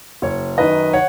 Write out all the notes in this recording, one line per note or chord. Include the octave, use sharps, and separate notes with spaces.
F#1 C#5
F#2 D#3 B4 D#5
C#5 F#5